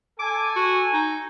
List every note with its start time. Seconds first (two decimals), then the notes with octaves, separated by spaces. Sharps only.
0.19 A4 G#5 D6
0.56 F#4
0.93 D#4